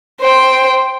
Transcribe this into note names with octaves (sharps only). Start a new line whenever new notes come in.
C5 G5